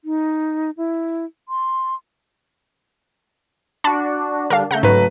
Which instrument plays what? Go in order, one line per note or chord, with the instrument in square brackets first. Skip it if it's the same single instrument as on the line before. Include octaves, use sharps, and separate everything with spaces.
[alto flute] D#4
E4
C6
[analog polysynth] D4 F#4 [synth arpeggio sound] A5 B5
[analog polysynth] D3 G3 D4 [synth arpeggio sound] A#4 F5
[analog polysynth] C#3 A3 [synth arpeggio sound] F#5 A#5 G6
[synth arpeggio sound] G#2 [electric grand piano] F#3 B4 A#5